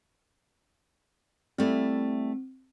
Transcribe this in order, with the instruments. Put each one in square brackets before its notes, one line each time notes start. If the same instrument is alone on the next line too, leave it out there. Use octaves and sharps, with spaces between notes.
[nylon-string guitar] G3 A3 E4 [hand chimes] C4